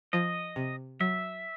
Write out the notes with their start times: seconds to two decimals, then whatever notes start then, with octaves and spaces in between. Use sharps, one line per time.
0.13 F3 D#5
0.56 C3
1.00 F#3 E5